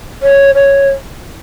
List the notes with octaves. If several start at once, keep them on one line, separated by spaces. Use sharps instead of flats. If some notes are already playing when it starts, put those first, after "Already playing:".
C#5
C#5